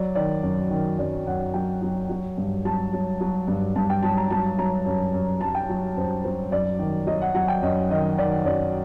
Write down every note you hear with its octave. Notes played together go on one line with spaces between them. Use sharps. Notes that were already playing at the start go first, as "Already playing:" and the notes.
Already playing: F#3 D5
D#3 D5
F#2
D#3
F#2 D5
F#2 F#5
F#3 G5
F#3
F#3
G2
F#3 A5
F#3
F#3
G2
G2 A5
G5
F#3 A5
A#5
F#3 A5
F#3 A#5
F#2
F#2
F#3 A5
G5
F#3
F#2 C5
F#3 C5
F#2 D5
D#3
F#3 D#5
F#5
F#3 F#5
G5
F#2 D#5
D#3 D#5
D#3 D5
F#2 D5